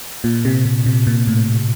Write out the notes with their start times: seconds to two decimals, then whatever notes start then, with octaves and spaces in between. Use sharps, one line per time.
0.24 A#2
0.45 C3
0.65 C3
0.86 C3
1.07 A#2
1.28 A2